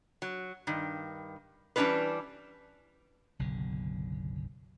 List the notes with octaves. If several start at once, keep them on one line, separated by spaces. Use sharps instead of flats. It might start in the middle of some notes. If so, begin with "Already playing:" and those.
F#3
G2 D#3
E3 G3 C#4 D4 F4 B4
F#1 B1 B2 D3